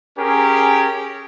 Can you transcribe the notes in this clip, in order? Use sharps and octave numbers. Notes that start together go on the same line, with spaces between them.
C#4 G4 G#4 A#4